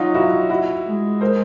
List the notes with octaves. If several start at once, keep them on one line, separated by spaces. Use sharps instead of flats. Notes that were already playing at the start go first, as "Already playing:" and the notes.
Already playing: F#3 D#4 F4
E4 F#4
E4 F#4
G#3
A#4 C5